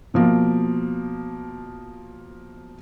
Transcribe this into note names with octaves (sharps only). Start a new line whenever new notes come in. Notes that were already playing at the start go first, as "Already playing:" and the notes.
B2 F3 A#3